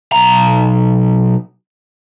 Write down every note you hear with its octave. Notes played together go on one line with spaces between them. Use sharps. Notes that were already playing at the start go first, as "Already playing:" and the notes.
B1 A#5